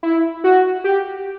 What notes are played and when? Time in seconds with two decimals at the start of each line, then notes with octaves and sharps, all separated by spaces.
0.03 E4
0.44 F#4
0.84 G4